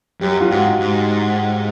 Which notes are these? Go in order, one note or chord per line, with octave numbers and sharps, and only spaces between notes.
F#2 G4
F4
G#2 F#4
G#2